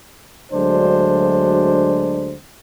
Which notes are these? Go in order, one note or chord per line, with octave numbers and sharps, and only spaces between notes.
D2 F#3 G#3 D4 C5